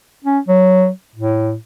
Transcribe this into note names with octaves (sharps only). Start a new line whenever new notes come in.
C#4
F#3
A2